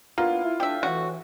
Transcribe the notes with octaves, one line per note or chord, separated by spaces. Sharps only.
A#3 B3 D4 E4 F4
E4
A2 D4 G4 E5
A2 E3 F#4